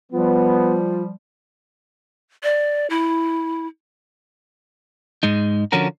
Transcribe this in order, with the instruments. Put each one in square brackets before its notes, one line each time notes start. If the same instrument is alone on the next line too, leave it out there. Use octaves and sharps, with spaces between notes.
[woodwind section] F3 G3 [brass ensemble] B3 [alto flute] F4
[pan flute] D5
E4
[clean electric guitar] G#2 G#3 D#4
D3 F3 C#4 F#4 A#4